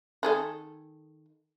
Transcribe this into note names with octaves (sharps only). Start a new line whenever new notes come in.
D#3 G#4 A4